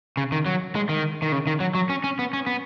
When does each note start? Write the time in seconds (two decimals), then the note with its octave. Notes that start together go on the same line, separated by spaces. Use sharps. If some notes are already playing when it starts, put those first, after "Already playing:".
0.17 C#3
0.32 D#3
0.46 F#3
0.75 G#3
0.89 D#3
1.22 D#3
1.32 C#3
1.47 D#3
1.60 F#3
1.75 F#3
1.89 C#4
2.04 C#4
2.19 B3
2.33 C#4
2.47 B3